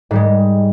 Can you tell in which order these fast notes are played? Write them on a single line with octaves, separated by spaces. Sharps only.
G#2 G3 G#3